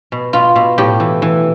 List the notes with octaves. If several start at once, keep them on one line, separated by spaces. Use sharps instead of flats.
B2
B2 F4
B2
A2 G4
E3
E3